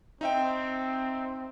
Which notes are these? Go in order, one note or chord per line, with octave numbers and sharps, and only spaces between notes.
C4 D#4 E5 G5